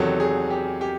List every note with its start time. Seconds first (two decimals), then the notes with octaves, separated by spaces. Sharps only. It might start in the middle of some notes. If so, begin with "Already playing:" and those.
Already playing: E2 C3 D#3 F#3 A4
0.20 G#4
0.50 G4
0.81 G4